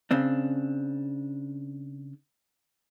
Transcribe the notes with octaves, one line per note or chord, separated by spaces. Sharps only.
C#3 C4 D4